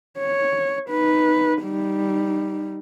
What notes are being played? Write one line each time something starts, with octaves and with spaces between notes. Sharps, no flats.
C#5
D#4 B4
G3 D#4